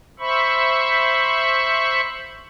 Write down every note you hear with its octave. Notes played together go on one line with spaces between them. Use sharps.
C5 E5 B5 C#6